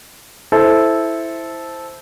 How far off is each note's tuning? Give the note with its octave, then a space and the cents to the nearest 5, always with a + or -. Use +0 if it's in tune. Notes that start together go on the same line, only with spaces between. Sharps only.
E4 +0 A4 -10 C5 +0